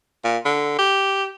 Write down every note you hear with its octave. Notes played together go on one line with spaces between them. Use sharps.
A#2
D3
G4